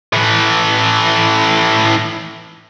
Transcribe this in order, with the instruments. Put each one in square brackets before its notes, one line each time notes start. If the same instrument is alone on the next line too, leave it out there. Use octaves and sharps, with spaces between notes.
[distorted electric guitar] A2 E3